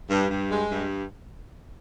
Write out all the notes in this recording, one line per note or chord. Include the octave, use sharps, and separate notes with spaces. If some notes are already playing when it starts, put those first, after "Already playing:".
G2
G2
G#3
G2